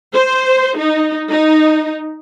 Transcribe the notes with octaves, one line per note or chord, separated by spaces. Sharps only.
C5
D#4
D#4